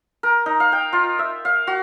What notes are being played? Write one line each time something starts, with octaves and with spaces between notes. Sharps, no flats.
A#4
D#4
F5
G5
F4
E5
F5
F#4